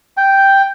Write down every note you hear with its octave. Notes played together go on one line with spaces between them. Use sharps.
G5